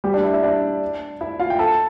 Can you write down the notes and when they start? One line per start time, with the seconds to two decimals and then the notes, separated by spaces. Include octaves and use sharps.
0.04 G3 G4
0.14 D4 D5
0.23 E4 E5
0.33 E4 E5
0.43 D4 D5
1.21 E4 E5
1.40 F4 F5
1.50 G5
1.59 A4 A5